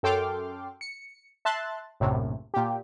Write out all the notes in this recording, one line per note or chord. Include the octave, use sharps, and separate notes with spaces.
F#2 A4 G5 C6 D6 F6
C#7
E5 A5 C6 F#6 A6
A#1 F#2 A2 C3
A#2 G4